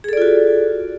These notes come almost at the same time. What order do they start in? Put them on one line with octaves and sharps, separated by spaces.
G#4 A4 D5 F4 F#4